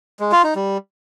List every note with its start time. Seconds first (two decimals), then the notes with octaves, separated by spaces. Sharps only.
0.20 G#3
0.32 F4
0.44 D#4
0.56 G3